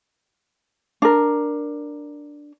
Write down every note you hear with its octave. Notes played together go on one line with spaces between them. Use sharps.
D4 A#4